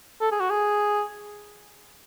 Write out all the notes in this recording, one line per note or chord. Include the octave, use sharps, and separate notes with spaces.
A4
G#4
F#4
G#4